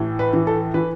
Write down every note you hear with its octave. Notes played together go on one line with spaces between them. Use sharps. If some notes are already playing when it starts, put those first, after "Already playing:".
Already playing: A2 E3
B4
E3
A4
E3 B4